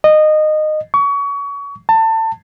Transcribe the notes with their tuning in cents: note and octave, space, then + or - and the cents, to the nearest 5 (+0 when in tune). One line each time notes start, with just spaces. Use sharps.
D#5 -20
C#6 +30
A5 +25